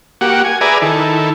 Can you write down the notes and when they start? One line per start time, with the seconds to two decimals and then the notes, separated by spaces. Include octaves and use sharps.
0.21 A#3 F#4 G4 F#5
0.45 G#5
0.61 G#4 B4 D5 E5 G#5 A#5
0.82 D#3 E4 A4